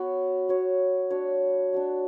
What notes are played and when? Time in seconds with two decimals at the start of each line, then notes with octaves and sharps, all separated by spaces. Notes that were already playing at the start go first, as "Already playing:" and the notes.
Already playing: B3 F#4 C#5
0.49 B3 F#4 C#5
1.10 D4 F#4 C#5
1.73 D4 F#4 C#5